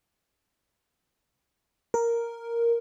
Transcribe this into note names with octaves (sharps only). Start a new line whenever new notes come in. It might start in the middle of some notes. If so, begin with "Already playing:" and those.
A#4